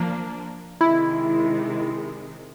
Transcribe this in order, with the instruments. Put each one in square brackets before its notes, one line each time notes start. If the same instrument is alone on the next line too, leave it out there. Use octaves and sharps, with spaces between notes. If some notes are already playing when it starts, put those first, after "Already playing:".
Already playing: [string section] F3 A#3 D4
[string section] C3 D#3 G#3 [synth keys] E4